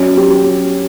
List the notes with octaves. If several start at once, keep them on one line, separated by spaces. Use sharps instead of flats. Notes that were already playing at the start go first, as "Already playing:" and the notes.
Already playing: F#3 C#4
G4